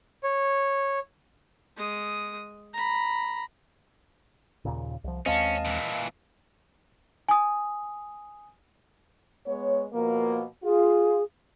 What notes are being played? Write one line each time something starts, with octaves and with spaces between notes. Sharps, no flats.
C#5
G#3 D#6
A#5 B5
D#2 A#2 C#3
C2 F3
D#2 G#3 C4 C#4 D#5 F5 A5
A#2 E3
G#5 D#6
G#3 B3 C#5
B2 F3 A#3
F4 G#4